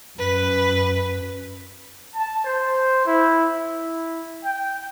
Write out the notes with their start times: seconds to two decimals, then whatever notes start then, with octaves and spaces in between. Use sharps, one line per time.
0.19 F#2 B4
2.15 A5
2.45 C5
3.06 E4
3.56 E4
4.44 G5